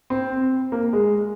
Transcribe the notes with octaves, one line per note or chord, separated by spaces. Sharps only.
C4
A#3
G#3